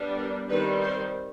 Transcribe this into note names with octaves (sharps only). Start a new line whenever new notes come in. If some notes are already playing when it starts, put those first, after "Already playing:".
Already playing: G3 B3 D4
A#4
D#3 G3 C4 B4
C5